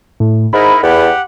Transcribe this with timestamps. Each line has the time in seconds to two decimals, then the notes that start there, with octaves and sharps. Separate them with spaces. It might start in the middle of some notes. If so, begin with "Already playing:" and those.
0.20 A2
0.53 G#2 D#4 E4 A#4 B5
0.83 E2 G4 F#5